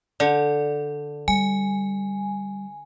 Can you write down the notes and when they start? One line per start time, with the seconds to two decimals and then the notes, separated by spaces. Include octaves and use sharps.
0.20 D3 D5
1.28 G3 G#5